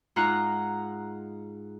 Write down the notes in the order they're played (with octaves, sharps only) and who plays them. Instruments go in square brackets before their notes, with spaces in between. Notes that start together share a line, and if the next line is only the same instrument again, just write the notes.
[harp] G#2 D#4 F4 F#5 A#5 F#6